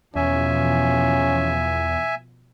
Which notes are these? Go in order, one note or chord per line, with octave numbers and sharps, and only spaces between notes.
E2 B2 F3 C#4 E5 G#5